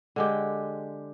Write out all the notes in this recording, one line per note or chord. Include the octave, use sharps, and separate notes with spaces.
D3 G#3 G4